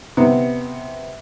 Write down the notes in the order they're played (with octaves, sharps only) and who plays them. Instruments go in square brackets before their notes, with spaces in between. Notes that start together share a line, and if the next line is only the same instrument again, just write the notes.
[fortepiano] C3 B3